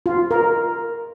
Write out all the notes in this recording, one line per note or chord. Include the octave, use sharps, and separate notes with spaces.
F4
A#4